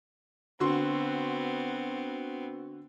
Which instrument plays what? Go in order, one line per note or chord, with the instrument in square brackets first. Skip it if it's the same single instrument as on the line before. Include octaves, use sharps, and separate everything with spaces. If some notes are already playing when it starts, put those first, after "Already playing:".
[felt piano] D3 F#4 C6 [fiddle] B3 C4